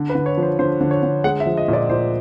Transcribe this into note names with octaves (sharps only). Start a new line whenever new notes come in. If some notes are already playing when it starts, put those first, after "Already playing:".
Already playing: D3
B4
D3
C#5
F3
C5
D3 C5
D3
C#5
D3
G#3 F#5
E5
F3
D#5
A#2
D5
A#2 C5